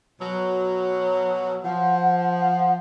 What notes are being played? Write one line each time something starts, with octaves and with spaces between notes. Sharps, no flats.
B2 F#3
F3 F#5